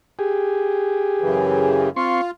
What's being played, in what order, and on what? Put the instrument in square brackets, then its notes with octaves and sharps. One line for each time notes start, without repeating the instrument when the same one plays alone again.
[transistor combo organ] G4 G#4
[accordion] F#2 C#3 E3
[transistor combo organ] C4 C6 C#6 [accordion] F4